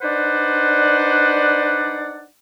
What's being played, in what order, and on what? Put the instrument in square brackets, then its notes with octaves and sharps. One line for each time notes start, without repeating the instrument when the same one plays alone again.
[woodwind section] D4 D#4 B4 C5 D5 F#5